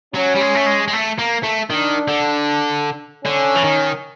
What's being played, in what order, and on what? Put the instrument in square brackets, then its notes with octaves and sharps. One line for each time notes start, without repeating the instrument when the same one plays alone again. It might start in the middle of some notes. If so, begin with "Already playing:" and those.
[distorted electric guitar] F#3 [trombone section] C#4
[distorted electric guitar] G3
G#3
A3
G#3
G#3
A3
A#3
A3
[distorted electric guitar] D#3 [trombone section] D4
[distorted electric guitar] D3
[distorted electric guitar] D3 [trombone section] C#4
[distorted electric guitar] E3
D#3